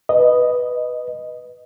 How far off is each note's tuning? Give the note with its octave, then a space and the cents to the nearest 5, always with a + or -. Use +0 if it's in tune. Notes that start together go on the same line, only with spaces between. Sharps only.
B4 +0 D#5 -5